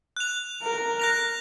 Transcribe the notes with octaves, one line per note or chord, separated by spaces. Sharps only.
F#6 F7
A#4
F#6 A#6 F7